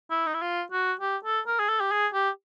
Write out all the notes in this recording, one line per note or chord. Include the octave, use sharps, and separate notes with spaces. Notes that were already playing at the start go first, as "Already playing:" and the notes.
E4
D#4
E4
F4
F#4
G4
A4
A#4
G#4
A4
G4
G#4
G4